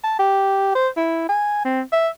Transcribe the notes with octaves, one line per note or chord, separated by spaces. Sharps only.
A5
G4
C5
E4
G#5
C4
E5